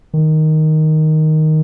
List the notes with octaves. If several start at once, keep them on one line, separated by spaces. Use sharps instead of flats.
D#3